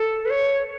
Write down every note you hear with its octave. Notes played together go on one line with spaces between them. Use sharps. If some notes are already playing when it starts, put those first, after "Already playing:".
Already playing: A4
B4
C#5